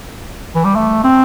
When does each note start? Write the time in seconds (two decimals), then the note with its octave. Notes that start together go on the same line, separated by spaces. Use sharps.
0.55 E3
0.65 G3
0.75 A3
1.04 C4